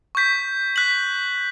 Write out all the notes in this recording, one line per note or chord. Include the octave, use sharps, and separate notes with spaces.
C#6 G6 B6
F#6 B6 F#7